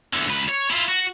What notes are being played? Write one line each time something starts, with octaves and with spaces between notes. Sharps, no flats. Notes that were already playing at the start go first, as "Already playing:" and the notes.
E2 D3
C#2 B4
C#5
E4 F4
F#4